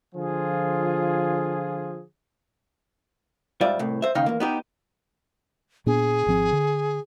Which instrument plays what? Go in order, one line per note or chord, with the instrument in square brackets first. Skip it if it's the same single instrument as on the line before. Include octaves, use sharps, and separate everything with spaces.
[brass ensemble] D3 F3 F4 G#4
[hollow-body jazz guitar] G#2 G3 F4 D5 E5
C2 A2
C5 E5
D#2 C#3 D#4 F5 G5
E2 A#3
B3 D#4 G4
[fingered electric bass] A#2 B3 D4 [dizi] G#4
[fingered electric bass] G#1 F3 C4
D3